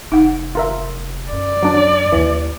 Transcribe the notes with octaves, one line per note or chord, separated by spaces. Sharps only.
F1 D#4 F#5
F4 A#4 E5
F#2 D5
F#3 D4
D#2 E3 E4